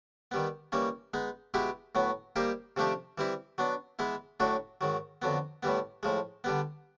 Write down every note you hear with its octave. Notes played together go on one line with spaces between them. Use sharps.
D#3 G3 B3
E3 G3 A#3 C#4
G#3 B3 D#4
B2 G#3 B3 E4 G4
A2 F#3 B3
G3 A#3 D#4 G4 C5
C3 F3 A3 D4 G4
E3 G3 C4 E4
F#3 B3 D4
E3 G#3 B3 E4
A2 F#3 A3 D4 F#4
G#2 D#3 F#3
F2 D3 F#3 B3
A2 E3 G3 B3
A2 F3 G#3
D3 G3 B3